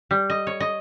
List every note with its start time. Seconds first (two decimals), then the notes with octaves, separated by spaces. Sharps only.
0.11 G3
0.30 D#5
0.47 C#5
0.60 D#5